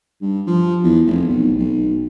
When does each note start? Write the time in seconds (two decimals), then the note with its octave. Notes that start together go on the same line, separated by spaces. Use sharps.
0.21 G2
0.47 F3
0.84 E2
1.06 F1
1.29 B1
1.59 B1